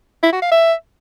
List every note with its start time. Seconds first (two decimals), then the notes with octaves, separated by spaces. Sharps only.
0.23 E4
0.33 F#4
0.42 F5
0.52 E5